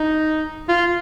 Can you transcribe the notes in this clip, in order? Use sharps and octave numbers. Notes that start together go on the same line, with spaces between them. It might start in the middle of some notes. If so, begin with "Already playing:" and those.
Already playing: D#4
F4